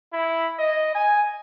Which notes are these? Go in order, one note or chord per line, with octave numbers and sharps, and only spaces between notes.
E4
D#5
G#5